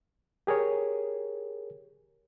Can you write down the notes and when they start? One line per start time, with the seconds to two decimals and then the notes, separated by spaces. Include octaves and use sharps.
0.47 G4 G#4 A#4 C#5